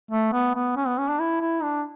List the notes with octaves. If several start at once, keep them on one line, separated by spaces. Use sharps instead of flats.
A3
B3
B3
C#4
B3
C#4
D4
E4
E4
D4